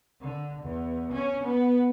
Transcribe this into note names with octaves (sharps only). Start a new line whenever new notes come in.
D3
E2
C#4
B3